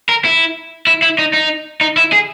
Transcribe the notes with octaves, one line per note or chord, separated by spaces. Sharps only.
A#4
E4
E4
E4
D#4
D#4
D#4
E4
G#4